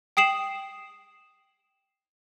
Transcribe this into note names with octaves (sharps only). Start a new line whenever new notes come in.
G5 D#6 C7 E7 F#7